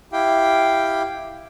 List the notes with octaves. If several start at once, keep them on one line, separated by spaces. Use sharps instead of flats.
E4 G4 F5 G5